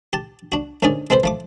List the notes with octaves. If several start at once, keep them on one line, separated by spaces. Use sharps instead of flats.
G4 A5
D4 F#4
G#2 D3 D#3 C#4 G#4 D5
G#3 C4 A4 B4 C5
F3 A3 D6